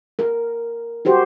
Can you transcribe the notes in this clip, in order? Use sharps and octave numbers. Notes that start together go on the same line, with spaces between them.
A#4
F#4 G4 C5